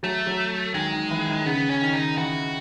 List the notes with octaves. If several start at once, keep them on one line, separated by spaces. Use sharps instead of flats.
F#3 A3
F#3
D#3 G#3
D#3
E3
D#3
C#3 B3
C#4
D#3
D#4
E3 F#4